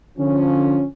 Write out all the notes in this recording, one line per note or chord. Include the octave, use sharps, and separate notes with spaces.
D3 F3 C#4